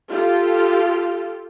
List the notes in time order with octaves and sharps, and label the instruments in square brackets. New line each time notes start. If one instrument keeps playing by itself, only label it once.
[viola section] F4 G4 A4